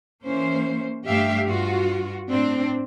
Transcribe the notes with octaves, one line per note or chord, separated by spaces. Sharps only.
E3 A#3 C#4 C5
G2 A3 G4 E5 F5
G2 F4 F#4
A2 C4 D4